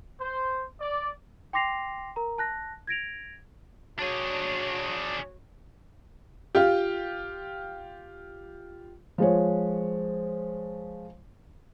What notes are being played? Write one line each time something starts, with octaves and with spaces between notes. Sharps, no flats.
C5
D5
G5 C6 D6 A#6 C7 F7
A#4 A#5
A5 F#6 A#6
G#6 A#6 D7 F7
D4 F#4 G#4 C#5
F4 G4
F3 G#3 C#5